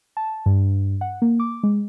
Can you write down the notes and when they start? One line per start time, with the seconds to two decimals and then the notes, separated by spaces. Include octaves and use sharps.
0.17 A5
0.46 G2
1.01 F#5
1.22 A#3
1.40 D6
1.63 G#3